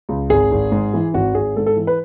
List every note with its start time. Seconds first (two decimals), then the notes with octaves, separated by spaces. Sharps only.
0.09 C#2
0.30 G#1 G#4
0.52 G#1
0.72 G#2
0.94 E3
1.14 G#1 F#4
1.34 G#1 G#4
1.56 G#2 A4
1.66 A4
1.77 E3
1.87 B4